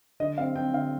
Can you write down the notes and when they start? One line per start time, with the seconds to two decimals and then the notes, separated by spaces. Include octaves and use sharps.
0.20 D3 D#5
0.38 C4 F5
0.55 C4 G5
0.74 D3 F5